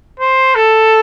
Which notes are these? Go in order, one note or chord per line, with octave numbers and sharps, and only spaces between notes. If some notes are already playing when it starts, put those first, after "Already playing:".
C5
A4